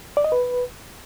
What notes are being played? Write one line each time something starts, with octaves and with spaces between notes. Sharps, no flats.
D5
D#5
B4